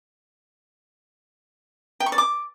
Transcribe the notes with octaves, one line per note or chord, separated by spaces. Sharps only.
G5
C#6
D5
D6